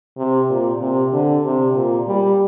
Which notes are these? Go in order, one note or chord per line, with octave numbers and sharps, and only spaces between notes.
C3
A#2
C3
D3
C3
A#2
G3